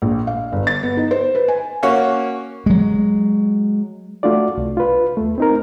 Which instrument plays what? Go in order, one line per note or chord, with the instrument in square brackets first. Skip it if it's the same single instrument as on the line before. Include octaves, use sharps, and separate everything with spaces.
[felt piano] A#1
F5
G1
A6
B3
D#4
C5
B4
G#5
[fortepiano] A#3 C#4 F#4 C#5
[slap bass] F#3 G#3
[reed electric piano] A3 D4 F4 F#4 D5
C2
F4 B4
D#2 A3
C4 D#4 A#4